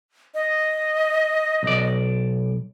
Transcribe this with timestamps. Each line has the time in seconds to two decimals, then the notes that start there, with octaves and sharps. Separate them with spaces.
0.34 D#5
1.63 B1 D5